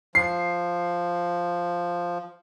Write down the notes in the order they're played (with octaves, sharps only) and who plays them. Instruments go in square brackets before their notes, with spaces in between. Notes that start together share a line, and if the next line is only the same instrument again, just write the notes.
[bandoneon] F3 [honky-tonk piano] C7